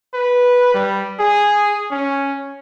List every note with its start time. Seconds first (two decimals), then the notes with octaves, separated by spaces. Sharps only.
0.14 B4
0.74 G3
1.20 G#4
1.91 C#4